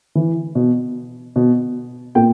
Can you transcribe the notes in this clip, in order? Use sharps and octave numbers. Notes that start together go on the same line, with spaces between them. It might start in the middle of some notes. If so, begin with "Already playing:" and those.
E3
B2
B2
A#2 G5